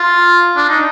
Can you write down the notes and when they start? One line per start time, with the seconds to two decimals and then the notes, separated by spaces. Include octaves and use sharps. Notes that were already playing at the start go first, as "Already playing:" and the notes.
Already playing: F4
0.56 D4
0.69 D#4